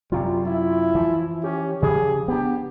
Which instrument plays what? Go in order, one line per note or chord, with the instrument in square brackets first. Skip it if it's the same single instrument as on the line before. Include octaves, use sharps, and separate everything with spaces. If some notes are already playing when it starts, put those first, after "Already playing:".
[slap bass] F#2 C3 F#3 [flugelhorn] G3 [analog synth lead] F4
[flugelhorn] E4
[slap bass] E3 F3
[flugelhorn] C#4 [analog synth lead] G4
[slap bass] C#3 F3 [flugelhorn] G#4
[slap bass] B3 D4 [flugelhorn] G4